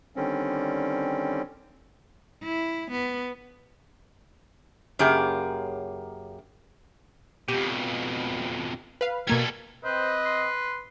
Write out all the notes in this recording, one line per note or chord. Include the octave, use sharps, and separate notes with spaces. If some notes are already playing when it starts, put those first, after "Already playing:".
D3 D#3 G3 C4 C#4
E4
B3
F#2 C#3 A#3 G4 G#4
F2 B2 G4
B4 F5
B2 G3 A#3 A4 G#6
C4 B4 C5 D#5
C6